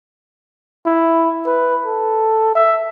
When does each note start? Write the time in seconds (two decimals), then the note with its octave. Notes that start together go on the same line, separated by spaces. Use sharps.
0.86 E4
1.46 B4
1.86 A4
2.55 E5